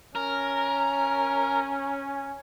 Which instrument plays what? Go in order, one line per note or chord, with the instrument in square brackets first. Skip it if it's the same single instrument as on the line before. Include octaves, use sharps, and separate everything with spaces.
[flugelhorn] C#4 [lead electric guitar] A#4